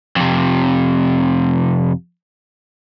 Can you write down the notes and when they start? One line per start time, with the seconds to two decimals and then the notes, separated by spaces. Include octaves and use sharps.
0.16 F2 C3